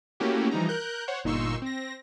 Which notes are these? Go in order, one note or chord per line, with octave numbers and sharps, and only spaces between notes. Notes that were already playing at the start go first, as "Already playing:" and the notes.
A3 A#3 C#4 E4 F#4 G4
E3 F3 G3 D#4 A#5
A#4 F#6 G6
C5 C#5 F#5
G1 A#2 D#4 C6 C#6 E6
C4 A#6